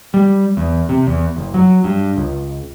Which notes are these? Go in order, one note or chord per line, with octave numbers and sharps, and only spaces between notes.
G3
E2
C3
E2
F#1
F#3
G2
C#2